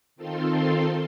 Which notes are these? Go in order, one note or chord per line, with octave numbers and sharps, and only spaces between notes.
D#3 C4 F4 A4 C6